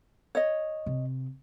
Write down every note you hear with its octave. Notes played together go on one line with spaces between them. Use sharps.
C#5 D#5
C3